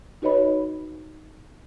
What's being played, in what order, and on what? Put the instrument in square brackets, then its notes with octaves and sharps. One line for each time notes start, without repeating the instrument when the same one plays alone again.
[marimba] D#4 F#4 B4 C#5 D#5 B5